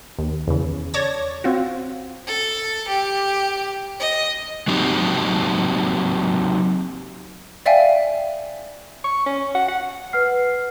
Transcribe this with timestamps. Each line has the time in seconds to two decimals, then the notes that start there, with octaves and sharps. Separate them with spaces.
0.19 D#2
0.48 E2 C#3
0.94 C#5 D5 A5 G#6 A#6
1.44 C4 F4 F#4
2.27 A4
2.88 G4
4.00 D#5
4.68 F#3 C4 D#4 G4
7.66 D5 E5 F5 G5 G#5
9.04 C#6
9.26 C#4
9.55 F#5
9.68 F#5
10.13 B4 F#5 F6 C7